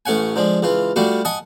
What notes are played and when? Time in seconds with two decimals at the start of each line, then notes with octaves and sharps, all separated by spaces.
0.05 A1 A3 C#4 F#5 G#5
0.36 D3 F3 G#3
0.62 C#2 E3 F4
0.96 G3 A3 D4 F4 F#4
1.25 D#5 F#5 G#5 A5 D#6